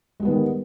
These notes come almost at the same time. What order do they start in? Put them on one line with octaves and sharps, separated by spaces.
G#3 G3 B3 D#3